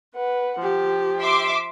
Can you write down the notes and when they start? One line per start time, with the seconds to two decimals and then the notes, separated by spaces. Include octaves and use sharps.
0.16 B4 F#5
0.62 F3 G4
1.20 E5 C6 D6